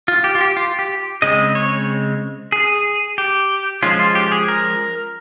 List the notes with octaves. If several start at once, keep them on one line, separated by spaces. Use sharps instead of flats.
F4
G4
F4
G4
F4
G4
C#3 G#3 C4 D#5
C#5
G#4
G4
F3 G#3 C#4 F4
F4
G4
G#4
A#4